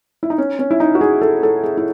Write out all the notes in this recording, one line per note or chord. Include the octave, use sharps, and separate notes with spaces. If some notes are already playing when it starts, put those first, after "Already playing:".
E4
D#4
C#4
C#4
E4
D#4
F#4
G#4
A4
A4
G#4
E4